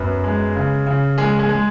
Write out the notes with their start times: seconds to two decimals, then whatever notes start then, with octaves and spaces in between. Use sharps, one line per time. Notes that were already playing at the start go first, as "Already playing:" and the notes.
Already playing: F#2 B3 B4
0.24 G#3
0.56 C#3
0.87 C#3
1.18 G#3 G#4
1.39 G#3 G#4
1.49 G#3